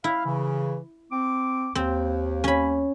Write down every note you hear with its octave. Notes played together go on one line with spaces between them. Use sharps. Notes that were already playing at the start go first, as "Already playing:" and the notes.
E4 F5
C#3 E3
C4 D6
D#2 C4
C#4 B5